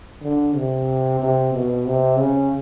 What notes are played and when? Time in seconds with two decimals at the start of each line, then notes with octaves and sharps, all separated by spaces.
0.22 D3
0.55 C3
1.20 C3
1.53 B2
1.85 C3
2.18 C#3